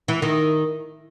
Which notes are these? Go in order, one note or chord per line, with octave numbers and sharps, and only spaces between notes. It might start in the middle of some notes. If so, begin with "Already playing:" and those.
E3
D#3